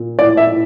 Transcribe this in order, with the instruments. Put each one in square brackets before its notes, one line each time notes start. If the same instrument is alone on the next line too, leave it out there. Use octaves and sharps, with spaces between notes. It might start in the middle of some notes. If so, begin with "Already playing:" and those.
Already playing: [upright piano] A#2
A2 D5
E5
A2